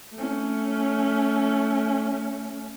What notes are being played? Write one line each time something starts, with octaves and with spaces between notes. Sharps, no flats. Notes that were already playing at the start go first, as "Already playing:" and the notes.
A3 C#4